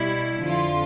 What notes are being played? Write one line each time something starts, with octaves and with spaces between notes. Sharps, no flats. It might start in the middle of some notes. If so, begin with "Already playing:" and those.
Already playing: B2 G3 E4
F2 D3 F3 F4